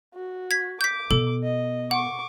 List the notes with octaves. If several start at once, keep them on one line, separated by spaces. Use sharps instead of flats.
F#4
G#6 B6
D6 G6 B6
B2 A4
D#5
F#5 C#6 D6